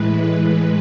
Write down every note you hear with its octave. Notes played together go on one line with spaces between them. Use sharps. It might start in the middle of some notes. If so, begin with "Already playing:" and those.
Already playing: A2 E3 G#3 B4